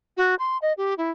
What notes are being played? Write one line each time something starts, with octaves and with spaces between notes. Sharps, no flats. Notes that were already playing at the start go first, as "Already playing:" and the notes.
F#4
C6
D#5
G4
E4